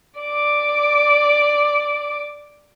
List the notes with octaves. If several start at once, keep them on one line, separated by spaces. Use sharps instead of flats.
D5 D6